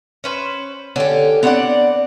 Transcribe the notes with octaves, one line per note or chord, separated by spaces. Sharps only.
C#4 B4 C5
D3 C#4 G4
B3 C4 D4 D5 F#5